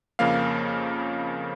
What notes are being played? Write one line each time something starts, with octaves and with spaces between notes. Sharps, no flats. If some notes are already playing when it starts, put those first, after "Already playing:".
F2 C#3 F3 A#3 F5